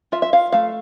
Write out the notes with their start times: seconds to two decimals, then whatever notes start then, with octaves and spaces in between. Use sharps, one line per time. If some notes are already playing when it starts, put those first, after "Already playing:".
0.12 F4 E5
0.22 E5
0.33 F4 F5
0.52 A3 F5